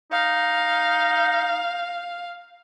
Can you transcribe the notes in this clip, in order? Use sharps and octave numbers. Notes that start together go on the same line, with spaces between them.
D#4 F5